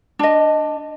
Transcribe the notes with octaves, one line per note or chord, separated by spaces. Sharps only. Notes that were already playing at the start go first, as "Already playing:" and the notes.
D4 D#5